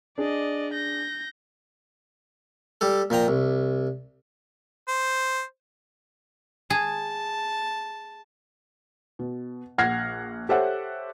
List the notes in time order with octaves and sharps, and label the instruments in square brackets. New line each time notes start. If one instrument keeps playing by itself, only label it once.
[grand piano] D4 G#4 [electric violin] D5 D#5
[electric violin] G6 A#6
[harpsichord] G3 G4 A4
A#2 F3 G5 A#5
C2
[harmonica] C5
[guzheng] G#4 [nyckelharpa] A5
[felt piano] B2
A#1 F#5 F6 G#6 A#6 C7
G4 A4 C5 C#5 E5 F#5